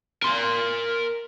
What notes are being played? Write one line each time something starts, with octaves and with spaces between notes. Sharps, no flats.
A#4 C6